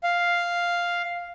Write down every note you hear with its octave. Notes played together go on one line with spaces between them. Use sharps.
F5